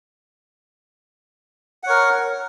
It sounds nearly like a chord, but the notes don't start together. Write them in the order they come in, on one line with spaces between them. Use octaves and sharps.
F#5 C#5 A#4